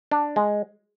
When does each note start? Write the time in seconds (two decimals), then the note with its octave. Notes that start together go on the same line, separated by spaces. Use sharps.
0.12 D4
0.36 G#3